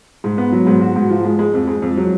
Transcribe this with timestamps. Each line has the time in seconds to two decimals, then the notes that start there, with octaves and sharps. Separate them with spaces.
0.24 G#2
0.38 B3
0.52 F#3
0.67 G#2
0.81 F#4
0.96 G#2
1.10 F3
1.25 G#3
1.39 G#3
1.54 F2
1.68 G#3
1.82 F2
1.97 F#3